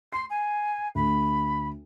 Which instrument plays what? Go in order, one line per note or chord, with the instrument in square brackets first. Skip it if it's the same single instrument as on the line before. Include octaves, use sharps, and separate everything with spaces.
[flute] C6 [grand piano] C7
[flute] G#5
[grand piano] D2 [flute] B5